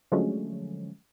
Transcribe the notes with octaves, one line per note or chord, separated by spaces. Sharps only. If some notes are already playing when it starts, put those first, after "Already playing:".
D3 F3 F#3 G#3 A3 C#4